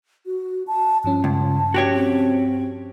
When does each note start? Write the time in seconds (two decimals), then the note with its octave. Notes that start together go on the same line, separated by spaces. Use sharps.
0.26 F#4
0.67 A5
1.04 G2 F3 C#4 A5
1.24 C#2
1.74 F#4 G4 C#5
1.94 C4